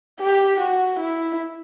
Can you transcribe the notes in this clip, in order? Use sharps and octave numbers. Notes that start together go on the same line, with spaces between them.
G4
F#4
E4